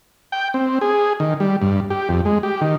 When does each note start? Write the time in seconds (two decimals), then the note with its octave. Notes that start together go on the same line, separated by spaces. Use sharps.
0.32 G5
0.54 C4
0.81 G#4
1.20 D#3
1.40 G3
1.62 G2
1.90 G4
2.09 F2
2.25 G#3
2.43 G4
2.61 D#3